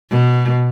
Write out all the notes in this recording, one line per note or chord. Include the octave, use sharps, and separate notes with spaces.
B2